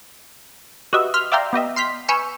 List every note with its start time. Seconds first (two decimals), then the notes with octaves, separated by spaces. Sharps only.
0.93 F#4 G4 B4 D#5 E5
1.14 C6 F6 B6
1.32 D5 E5 F5 G5 A#5 C6
1.53 B3 G4 D#5 E5
1.76 C6 F6 G6 B6
2.08 B4 G#5 C#6 E6 F6 G6